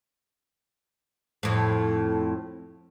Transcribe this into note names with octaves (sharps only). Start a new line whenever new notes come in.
F2 A2